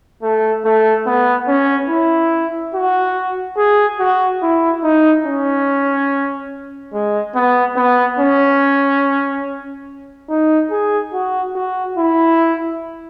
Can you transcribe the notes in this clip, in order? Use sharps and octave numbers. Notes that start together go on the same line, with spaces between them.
A3
A3
B3
C#4
E4
F#4
G#4
F#4
E4
D#4
C#4
G#3
B3
B3
C#4
D#4
G#4
F#4
F#4
E4